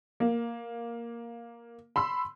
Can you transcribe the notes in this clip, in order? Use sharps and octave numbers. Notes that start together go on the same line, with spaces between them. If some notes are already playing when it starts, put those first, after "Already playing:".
A#3
B5 C6 E6